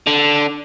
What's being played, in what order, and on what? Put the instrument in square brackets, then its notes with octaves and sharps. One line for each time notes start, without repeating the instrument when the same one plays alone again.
[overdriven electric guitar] D3